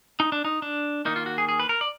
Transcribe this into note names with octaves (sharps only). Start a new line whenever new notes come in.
D#4
D4
D#4
D4
D#3 A#3 D#4
F4
F#4
G#4
G#4
B4
A#4
D5